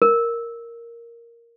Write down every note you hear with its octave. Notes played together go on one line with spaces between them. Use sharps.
A#4